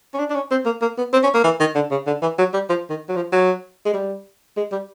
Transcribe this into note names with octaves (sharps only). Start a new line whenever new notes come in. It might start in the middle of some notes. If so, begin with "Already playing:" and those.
C#4
D4
D4
C#4
C4
A#3
A#3
B3
C4
C#4
A#3
E3
D#3
D3
C#3
D3
E3
F#3
G3
F3
D#3
F#3
F3
F#3
G#3
G3
G#3
G3